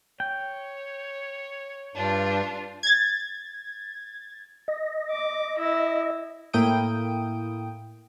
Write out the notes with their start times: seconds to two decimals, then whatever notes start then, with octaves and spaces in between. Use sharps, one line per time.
0.20 C#5 G5
1.96 G2 D4 F4
2.83 G#6 A6
4.68 D#5
5.11 D6
5.58 E4
6.53 A2 A#3 E4 G5 D#6 D7